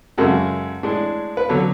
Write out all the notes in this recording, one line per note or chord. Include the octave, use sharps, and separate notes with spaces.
F#2 C#3 G#3 F#4 A4
A2 G#3 D4
B4
D3 F#3 B3 A4 C#5